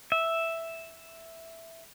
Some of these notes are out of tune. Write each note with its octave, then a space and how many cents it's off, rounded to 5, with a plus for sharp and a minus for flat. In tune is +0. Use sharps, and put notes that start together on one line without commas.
E5 +0